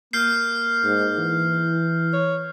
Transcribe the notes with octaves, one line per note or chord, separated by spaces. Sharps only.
A#3 F6 G6 C7
G#2
E3
C#5